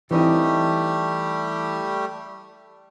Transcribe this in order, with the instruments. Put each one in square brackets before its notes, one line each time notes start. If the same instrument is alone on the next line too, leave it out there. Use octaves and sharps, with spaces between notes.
[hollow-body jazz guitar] E3 C4 D#4 [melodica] G3 A3 G4